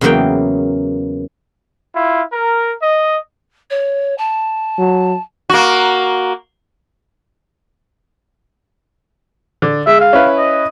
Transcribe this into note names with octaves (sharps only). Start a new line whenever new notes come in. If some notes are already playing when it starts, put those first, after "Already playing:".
E2 C#3 E3 F#3 A#3 G5
E4 F4
A#4
D#5
C#5
A5
F#3
A#3 F#4
D3
G#3 E5
F5
C#4 E4 B4
D#5